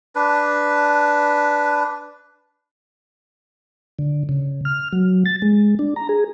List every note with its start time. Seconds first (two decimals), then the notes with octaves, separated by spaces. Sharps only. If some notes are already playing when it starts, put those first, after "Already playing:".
0.15 D4 B4
3.99 D3
4.29 C#3
4.65 F6
4.93 F#3
5.26 A6
5.42 G#3
5.79 D4
5.96 A#5
6.09 G#4